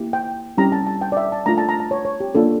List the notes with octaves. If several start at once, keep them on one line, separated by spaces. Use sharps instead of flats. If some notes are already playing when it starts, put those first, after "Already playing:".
Already playing: A#3 E4 G4
G5
G3 C#4 E4 G4 A#5
A5
A5
G5
D5
E5
A5
A3 D4 F4 A#5
A5
A#5
A5
C#5
C#5
G4
A#3 D4 F4 A4